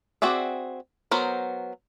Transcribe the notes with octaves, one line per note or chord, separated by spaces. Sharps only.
C4 F#4 G#4 D5 E5
F#3 B3 A#4 C5